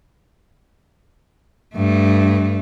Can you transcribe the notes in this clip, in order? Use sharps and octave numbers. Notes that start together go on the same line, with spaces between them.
G2 A3